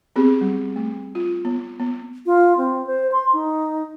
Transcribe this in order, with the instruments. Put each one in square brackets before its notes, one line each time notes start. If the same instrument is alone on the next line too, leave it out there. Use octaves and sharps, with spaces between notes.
[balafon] B3 C4 G4 G#4
G3
A3
F4
B3
B3
[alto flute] F4
C4
C5
C6
D#4